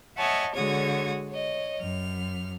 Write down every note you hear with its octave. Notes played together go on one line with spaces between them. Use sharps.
C#5 D#5 E5 F#5 G#5 A5
D3 G#3 F#4 C#5 D#6 G#6
C#5 D#5
F#2 F6